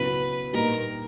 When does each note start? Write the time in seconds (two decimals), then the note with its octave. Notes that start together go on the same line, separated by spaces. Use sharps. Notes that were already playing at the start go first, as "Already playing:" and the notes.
Already playing: C#2 B2 F#3 B3 E4 B4
0.53 A#2 G3 A#3 D#4 G4 A#4